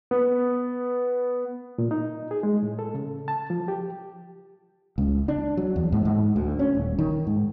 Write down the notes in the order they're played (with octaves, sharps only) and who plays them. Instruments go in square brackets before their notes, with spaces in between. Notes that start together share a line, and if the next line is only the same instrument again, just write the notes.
[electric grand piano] B3
[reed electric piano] A#2
D#4
G#4
G#3
A2
A4
C#3
A5
F3
G4
[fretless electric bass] C#2
D4
F#3
E2
G#2
G#2
D2
C#4
D#1
D#3
G#2